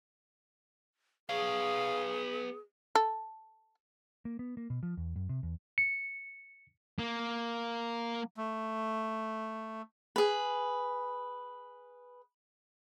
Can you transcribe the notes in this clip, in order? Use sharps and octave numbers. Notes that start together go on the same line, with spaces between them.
B3 G#4 C#5 F5
A4
A#3
B3
A#3
B2
F3
E2
F#2
C3
E2
C#7
A#3
A3
G#4 B4